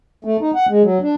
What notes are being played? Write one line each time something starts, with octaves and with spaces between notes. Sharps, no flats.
A3
D#4
F#5
G#3
F#3
D4